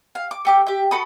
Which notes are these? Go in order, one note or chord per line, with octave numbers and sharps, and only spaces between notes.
F5
D6
A3 G4 D6
G4 E5
F#4 A4 B5 D#6